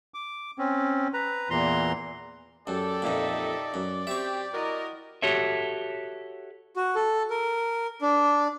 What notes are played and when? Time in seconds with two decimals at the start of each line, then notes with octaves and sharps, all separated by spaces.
0.14 D6
0.58 C4 C#4
1.14 B4 A#5
1.50 E2 A#2 E3 A#5 C6
2.67 F#2 G4 A4 D5
3.02 F2 A#2 D#4 E5
3.74 F#2
4.07 C4 G4 E5 C#6
4.53 E4 F#4 A#4 D#5
5.22 F#4 G4 A4 C#5 E5
6.76 F#4
6.95 A4
7.30 A#4
8.01 D4